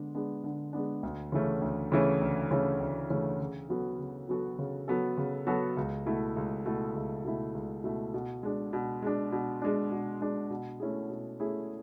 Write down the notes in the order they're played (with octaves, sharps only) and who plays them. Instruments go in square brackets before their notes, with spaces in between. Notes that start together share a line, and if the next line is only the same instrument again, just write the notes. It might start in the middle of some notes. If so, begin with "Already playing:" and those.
Already playing: [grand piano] D3 G#3 B3 D4
G#3 B3 D4
D3
G#3 B3 D4
D2
C#3 E3 A3 C#4
D2
C#3 E3 A3 C#4
D2
C#3 E3 A3 C#4
D2
C#3 E3 A3 C#4
C#3
F#3 B3 F#4 A4
C#3
F#3 B3 F#4 A4
C#3
F#3 B3 F#4 A4
C#3
F#3 B3 F#4 A4
C#2
B2 A3 E4
C#2
B2 A3 E4
C#2
B2 A3 E4
C#2
B2 A3 E4
B2
G#3 D4
B2
G#3 D4
B2
G#3 D4
B2
G#3 D4
B2
A3 C#4 E4 G#4
B2
A3 C#4 E4 G#4